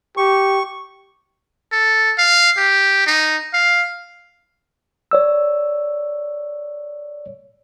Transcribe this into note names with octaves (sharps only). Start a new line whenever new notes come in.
G4 C#6
A4
F5
G4
D#4
F5
C#5 D5 E6